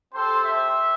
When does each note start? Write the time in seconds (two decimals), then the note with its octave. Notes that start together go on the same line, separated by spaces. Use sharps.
0.13 C4 G4 A4 C5
0.44 C5 E5